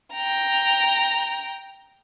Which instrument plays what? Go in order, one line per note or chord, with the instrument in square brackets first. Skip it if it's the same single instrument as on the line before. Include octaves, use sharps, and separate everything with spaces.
[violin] G5 A#5